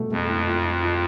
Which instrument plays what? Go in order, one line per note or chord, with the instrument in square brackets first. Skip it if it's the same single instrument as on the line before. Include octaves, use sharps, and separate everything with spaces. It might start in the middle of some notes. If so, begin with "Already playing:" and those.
Already playing: [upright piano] B2 A3
[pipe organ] F2 [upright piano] A3
[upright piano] E4
F4
F4
F4